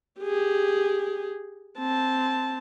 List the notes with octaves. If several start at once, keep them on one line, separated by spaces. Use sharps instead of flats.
G4 G#4
C4 A5